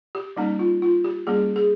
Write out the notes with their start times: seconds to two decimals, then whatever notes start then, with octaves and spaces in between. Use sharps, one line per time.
0.15 G4
0.36 G3 A#3 C#4 D#4
0.59 F4
0.82 F4
1.04 G4
1.27 G3 A#3 C#4 G#4
1.56 G#4